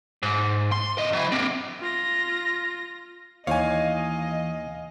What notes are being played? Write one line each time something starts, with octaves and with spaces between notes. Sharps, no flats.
G#2
C6
C#2 D#5
F#3 E4
A#3 C4
F4 A#6
D#2 E3 C#5 D#5 F5 G#5